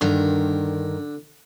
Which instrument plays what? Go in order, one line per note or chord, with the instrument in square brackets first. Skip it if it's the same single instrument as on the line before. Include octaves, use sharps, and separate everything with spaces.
[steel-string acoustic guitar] G2 D#3 A#4 [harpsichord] D3